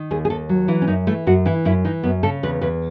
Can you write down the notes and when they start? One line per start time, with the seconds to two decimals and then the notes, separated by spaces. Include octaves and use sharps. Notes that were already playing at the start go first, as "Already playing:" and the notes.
Already playing: D#3
0.11 D#2 G#4
0.25 G#4
0.30 D#2 A4
0.49 F#3
0.68 E3 E4
0.82 C#4
0.87 F#2 D#4
1.07 E3 A3
1.27 F#2 F#4
1.46 E3 E4
1.65 F#2 E4
1.85 E3 D#4
2.03 F#2 B3
2.23 C#3 A4
2.43 E2 B4
2.61 E2 B4